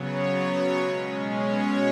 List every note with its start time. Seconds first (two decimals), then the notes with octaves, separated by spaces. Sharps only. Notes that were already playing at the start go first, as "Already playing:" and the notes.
Already playing: C#3 F#3 B3 C#5
0.19 C#5
0.79 B2 G#3 C#4
1.40 C#5